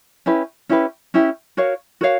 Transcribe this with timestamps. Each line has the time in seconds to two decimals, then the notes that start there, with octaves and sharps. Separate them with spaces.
0.26 C#4 E4 G4 B4
0.69 C#4 E4 G4 B4
1.14 C#4 E4 G4 B4
1.57 F#4 A#4 C#5 F5
2.01 F#4 A#4 C#5 F5